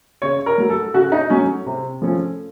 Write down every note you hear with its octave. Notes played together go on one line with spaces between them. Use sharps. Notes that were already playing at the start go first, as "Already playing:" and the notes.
C#3 C#5
A#4
F#3 A3
A4
C#3 F#4
D#4
F#3 A3 C#4
C3
F3 A3 C#4